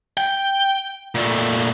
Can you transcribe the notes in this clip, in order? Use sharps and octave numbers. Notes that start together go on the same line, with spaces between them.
G5
A#2 A3